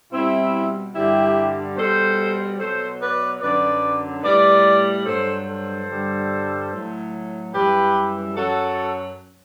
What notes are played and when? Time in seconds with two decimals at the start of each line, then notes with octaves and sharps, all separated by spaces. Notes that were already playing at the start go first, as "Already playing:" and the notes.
0.12 B2 G3 C4 E4
0.94 G2 D3 G3 E4 G4
1.76 B2 G3 A4 C5
2.58 B2 F#3 A4 C5
3.00 B4 D5
3.41 F#2 D3 F#3 B4 D5
4.23 A2 G3 B4 D5
5.05 G2 F#3 A4 C5
5.46 A4 C5
5.88 G2 D3 G3
6.70 A2 F#3
7.52 F#2 E3 G3 G4 B4
8.34 F#2 F#3 F#4 A4